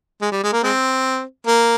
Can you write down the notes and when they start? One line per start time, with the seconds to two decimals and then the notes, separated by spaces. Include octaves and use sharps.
0.22 G#3
0.32 G3
0.43 G#3
0.53 A#3
0.63 G#3 C4
1.47 A#3